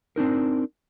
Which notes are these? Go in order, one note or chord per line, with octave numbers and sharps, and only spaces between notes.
C4 D4 D#4 A#4